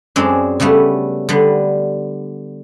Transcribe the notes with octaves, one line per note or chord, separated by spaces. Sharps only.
F#2 G#3 C4 D4
C#3 G3 A3 B3
D3 G3 B3